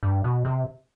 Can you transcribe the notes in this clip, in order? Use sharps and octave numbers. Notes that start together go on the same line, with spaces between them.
G2
B2
C3